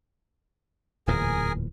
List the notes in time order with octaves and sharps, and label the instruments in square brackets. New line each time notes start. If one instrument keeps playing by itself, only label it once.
[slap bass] D1 E2 A#2 [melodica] G#4 A#4 G#5